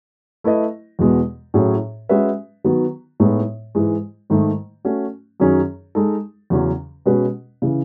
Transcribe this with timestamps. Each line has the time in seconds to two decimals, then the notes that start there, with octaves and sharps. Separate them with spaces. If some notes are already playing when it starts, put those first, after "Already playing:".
0.44 A3 E4 B4 D#5
0.99 E2 B2 G#3 B3
1.54 A2 F#3 C#4 G#4
2.09 G#3 C#4 F#4 B4 E5
2.64 D#3 F#3 B3 F#4
3.20 A2 G#3 B3 D#4
3.75 G#2 E3 G#3
4.30 G#2 D#3 A3
4.85 A3 C#4 F#4
5.40 F#2 D#3 F#3 C#4 G#4
5.95 G#3 D#4 A4
6.50 E2 C#3 F#3 C#4
7.06 B2 G#3 C#4 F#4 B4
7.62 C#3 E3